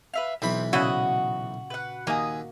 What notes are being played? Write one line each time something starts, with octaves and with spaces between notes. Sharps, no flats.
B4 E5 F5
B1 E3 C4 B5
A#2 C#3 E4 F#4 D#5 F#5
B4 F#5
D#2 A#3 G#5 D#6